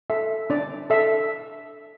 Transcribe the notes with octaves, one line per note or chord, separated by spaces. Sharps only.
A4 E5
D4 D5
A4 E5